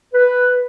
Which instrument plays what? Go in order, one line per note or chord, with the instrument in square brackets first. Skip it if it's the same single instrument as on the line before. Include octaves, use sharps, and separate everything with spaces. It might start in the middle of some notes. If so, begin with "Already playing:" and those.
[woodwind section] B4